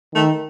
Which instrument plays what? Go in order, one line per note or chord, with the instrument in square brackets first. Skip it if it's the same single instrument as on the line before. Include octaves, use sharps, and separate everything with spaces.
[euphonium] D#3 [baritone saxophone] A3